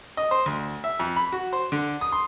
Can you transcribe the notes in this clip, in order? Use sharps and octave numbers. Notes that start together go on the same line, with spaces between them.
D#5
C5
D2
E5
F2
B5
F#4
C5
D3
D#6
C6